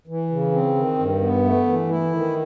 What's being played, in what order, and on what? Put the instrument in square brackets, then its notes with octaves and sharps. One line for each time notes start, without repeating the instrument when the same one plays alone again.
[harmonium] E3
C#3
C4
D#3
G2
B3
A3
E3
E4
D#3